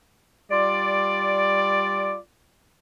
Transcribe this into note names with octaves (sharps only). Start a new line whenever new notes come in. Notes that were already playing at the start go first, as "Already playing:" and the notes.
G3 F4 D5